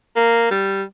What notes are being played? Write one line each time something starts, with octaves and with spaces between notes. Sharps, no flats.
A#3
G3